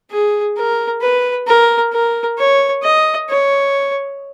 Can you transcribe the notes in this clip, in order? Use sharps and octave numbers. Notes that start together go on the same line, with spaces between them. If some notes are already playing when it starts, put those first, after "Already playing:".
G#4
A#4
B4
A#4
A#4
C#5
D#5
C#5